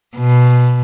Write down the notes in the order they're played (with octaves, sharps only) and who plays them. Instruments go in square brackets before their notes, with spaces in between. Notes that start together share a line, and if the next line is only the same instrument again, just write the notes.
[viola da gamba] B2